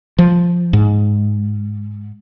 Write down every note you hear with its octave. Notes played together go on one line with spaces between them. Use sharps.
F3
G#2